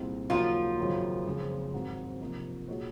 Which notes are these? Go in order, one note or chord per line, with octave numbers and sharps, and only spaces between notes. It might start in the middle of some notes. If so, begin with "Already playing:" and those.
Already playing: C2 A#2 G#3 C4 D#4
D#2 C#3 F3 F#3 A#3 D#4 F4
G#1 F#2 C#3 F#3 A#3
F#1 F2 C#3 G#3
G#1 G#2 D#3 F#3 C4
C3 F3 A#3 D#4
A#2 G#3 D#4 F#4 C#5